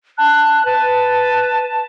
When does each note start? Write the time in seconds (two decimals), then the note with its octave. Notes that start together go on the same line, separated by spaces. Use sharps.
0.18 A5 F#6
0.65 B4 A5